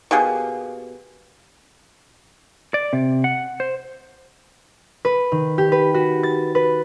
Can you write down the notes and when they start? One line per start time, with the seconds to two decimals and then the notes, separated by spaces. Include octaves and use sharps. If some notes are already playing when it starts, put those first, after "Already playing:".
0.11 B2 A#3 G4 G#4
2.74 D5
2.93 C3
3.24 F#5
3.60 C5
5.05 B4
5.32 D#3
5.58 G4
5.72 B4
5.94 F#4
6.23 A6
6.55 B4